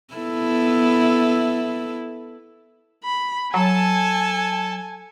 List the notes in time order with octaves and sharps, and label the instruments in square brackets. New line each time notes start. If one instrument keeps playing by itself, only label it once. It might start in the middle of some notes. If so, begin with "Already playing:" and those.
[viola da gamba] B3 E4 A4
[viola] B5
[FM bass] F#3 [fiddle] A4 A5 [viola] G#5